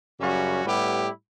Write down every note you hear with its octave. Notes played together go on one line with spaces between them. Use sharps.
F#2 C#3 G3 C#4 F#4
A2 G3 B3 E4 G4